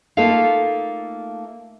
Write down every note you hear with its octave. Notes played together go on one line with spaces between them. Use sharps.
A3 A#3 D#4 F4 A4 F5